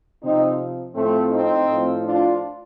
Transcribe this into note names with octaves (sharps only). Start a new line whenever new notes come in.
C3 F3 C4 D#4
A2 F3 A3 C4
C4 D#4
A2 F3
D4 F4